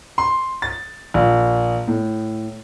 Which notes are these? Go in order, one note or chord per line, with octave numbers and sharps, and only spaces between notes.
C6
A6
A#1
A2